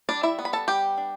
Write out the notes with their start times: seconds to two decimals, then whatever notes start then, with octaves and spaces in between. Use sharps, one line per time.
0.09 G3 D4 D5
0.23 E4 E5
0.39 B3
0.45 B5
0.53 A4 A5
0.68 G3 G4 G5
0.98 D4